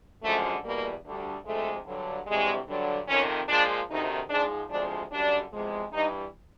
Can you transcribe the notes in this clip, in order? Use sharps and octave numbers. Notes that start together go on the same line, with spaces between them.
F#2 D3 F3 G#3 A3
E2 B2 G3 A#3
D2 D3 G3
D2 C3 F3 G#3 A3
G2 D3 F#3
D2 C3 E3 G3 G#3
G2 D3 F#3
F2 C3 D#3 C#4
A#2 F3 G#3 D4
D2 C3 D#3 D#4
G#2 F3 G#3 D4
D2 C3 F3 G#3 D4
F#2 D3 G3 D4
E2 C3 F3 G#3
G2 E3 G3 D#4